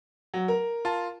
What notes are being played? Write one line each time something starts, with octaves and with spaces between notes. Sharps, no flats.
F#3
A#4
F4 A5